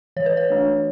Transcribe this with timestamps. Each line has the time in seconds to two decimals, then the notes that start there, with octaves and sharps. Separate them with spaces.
0.16 E3 C#5
0.26 B4
0.37 C#5
0.50 A3 D4